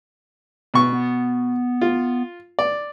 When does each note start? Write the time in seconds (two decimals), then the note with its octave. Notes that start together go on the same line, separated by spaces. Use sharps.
0.74 B2 C#6
0.93 B3
1.81 F4
2.59 D5